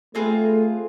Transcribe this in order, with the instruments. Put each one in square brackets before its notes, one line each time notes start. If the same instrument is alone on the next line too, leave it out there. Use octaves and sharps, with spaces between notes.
[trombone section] A3 [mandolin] C4 F4 G#4 B4